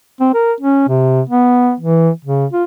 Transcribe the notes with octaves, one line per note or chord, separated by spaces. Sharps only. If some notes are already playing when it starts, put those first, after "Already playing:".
C4
A#4
C#4
C3
B3
E3
C#3
F4